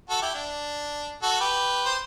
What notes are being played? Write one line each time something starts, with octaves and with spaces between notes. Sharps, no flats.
F#4 A4
E4 G4
D4
F#4 A4
G4 B4
C5